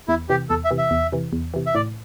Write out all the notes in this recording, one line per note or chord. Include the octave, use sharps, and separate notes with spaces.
E2 E4
C3 E3 G4
E2 A4
E5
C3 E3
E5
E2
C3 E3
E2
C3 E3
E5
A2 D5